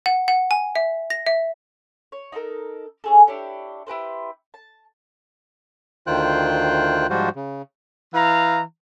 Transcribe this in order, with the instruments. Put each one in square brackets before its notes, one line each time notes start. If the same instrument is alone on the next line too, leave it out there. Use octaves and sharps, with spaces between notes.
[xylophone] F#5
F#5
G#5
E5
A#6
E5
[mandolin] C#5
D#4 F4 A4 A#4
C#4 G#4 A4
D4 E4 G4 C#5
E4 G4 B4 C5
A5
[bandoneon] D2 D#3 F4 C5 G5 F#6
G#2 F3 G3 F4 F#4 C5
C#3
[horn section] E3 F5 A#5